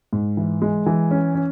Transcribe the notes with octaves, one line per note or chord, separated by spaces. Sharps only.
G#2
E3
G#3
E3
C#4
C#4